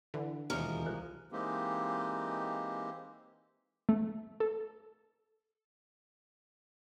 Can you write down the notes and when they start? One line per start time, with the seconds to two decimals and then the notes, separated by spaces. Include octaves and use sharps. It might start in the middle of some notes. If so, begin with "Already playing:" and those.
0.14 D3 E3
0.50 E1 D#2 E3 F3 G#3 A#4 C#6
0.86 C2 F4 A#5 F#6
1.32 E3 G#3 A#3 C4 D#4 G4
3.89 A3
4.40 A4